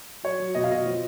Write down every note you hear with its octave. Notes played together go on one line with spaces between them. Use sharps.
F#3 C#5
F#3
B2 D#5
F5
B2 D#5
F3